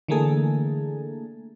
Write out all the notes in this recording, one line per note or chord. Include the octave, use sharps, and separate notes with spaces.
D3 E3 A3 A#3 G#4 A4